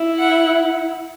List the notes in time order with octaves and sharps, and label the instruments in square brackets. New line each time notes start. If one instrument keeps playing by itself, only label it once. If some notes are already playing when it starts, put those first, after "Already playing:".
Already playing: [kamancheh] E4
[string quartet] F#5